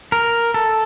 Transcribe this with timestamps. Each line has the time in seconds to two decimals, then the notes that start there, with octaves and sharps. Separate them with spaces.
0.12 A#4
0.54 A4